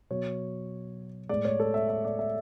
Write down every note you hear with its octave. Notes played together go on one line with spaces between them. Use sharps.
B2 F#3 C#5
A2 G#3 D5
C#5
A4
E5
E5
D5
E5